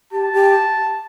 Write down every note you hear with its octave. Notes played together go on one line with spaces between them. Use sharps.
G4 A5
G4